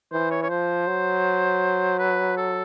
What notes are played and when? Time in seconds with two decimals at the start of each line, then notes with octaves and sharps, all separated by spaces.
0.12 E3 C5
0.31 C#5
0.43 C#5
0.50 F3 C5
0.87 F#3
1.99 B4
2.37 A4